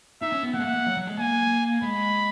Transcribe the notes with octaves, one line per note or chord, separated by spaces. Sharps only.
D#4 E5
C#4
B3
A#3 F#5
G#3
A#3
A#3
F#3
F#3
G#3
A#3 G#5
G#3 B5